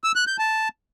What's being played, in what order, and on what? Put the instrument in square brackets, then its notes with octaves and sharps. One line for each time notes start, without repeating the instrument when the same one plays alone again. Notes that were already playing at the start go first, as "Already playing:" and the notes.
[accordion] E6
F#6
G6
A5